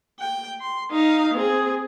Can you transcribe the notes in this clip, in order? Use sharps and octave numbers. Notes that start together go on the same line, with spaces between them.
G5
C6
D#4 F5
C4 G#4